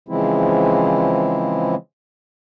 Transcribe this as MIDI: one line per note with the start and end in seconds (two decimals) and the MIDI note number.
0.09 1.75 49
0.09 1.75 52
0.09 1.75 53
0.09 1.75 56
0.09 1.75 60
0.09 1.75 64